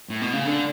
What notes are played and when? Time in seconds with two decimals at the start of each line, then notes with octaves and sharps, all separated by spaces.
0.09 A2
0.21 B2
0.33 C#3
0.45 D3